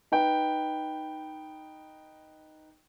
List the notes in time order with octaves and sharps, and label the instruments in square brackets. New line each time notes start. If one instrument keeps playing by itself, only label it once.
[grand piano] D#4 B4 G5